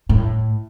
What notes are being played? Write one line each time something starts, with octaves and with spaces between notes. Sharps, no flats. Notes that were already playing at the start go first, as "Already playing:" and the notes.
A2